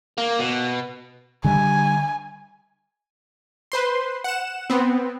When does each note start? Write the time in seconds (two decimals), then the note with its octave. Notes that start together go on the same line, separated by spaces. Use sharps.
0.18 A#3
0.39 B2
1.44 D3 G3 G#5
3.72 B4 C5 C6
4.24 F#5 E7
4.70 B3 C4